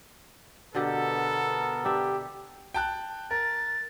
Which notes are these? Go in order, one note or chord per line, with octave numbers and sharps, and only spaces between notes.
B2 D3 B3 G4 A4 A#4
D4 G4 E5
G5 A5 F#6
A#4 A6